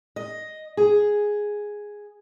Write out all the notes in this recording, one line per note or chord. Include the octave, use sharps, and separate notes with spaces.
D#5
G#4